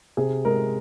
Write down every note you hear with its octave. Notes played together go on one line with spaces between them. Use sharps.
C3 G#4
G#3 A#4